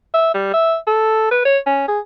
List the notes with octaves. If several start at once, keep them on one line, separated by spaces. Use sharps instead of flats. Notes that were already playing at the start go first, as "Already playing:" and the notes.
E5
G3
E5
A4
B4
C#5
C#4
G#4